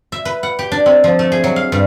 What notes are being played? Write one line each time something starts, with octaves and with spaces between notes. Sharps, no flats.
E5
B4
F#5
G4
D4
C4
F3
A3
G#4
F#3
F5
G2